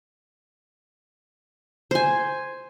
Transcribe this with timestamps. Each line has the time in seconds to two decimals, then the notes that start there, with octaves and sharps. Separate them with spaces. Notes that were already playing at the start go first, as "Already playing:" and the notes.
1.91 C5 G#5